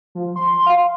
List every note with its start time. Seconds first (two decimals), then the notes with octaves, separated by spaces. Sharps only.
0.15 F3
0.36 C6
0.66 F5